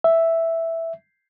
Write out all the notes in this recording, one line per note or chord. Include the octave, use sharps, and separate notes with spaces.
E5